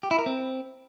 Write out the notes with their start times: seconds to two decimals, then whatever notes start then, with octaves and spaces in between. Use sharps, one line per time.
0.03 G4
0.11 E4
0.19 A#4
0.26 C4